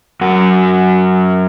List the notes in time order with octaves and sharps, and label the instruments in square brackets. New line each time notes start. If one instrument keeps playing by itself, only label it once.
[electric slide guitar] F#2 F#4